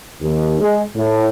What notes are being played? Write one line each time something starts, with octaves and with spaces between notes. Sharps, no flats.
D#2
G#3
A2